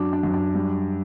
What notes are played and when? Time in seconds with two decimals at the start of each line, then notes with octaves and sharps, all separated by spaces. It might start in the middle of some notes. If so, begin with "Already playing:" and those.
Already playing: F#2 F#3 D4
0.13 D4
0.23 F#2
0.34 D4
0.55 G3